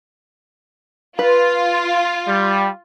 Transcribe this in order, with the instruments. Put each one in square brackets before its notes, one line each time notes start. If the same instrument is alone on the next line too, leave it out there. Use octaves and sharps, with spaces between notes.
[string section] F4 [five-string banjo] B4
[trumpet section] G3